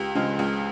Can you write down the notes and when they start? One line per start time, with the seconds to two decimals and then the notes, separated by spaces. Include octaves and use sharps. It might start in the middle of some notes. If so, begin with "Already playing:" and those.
Already playing: C#2 G4
0.15 C#3 F3 G#3
0.39 C#2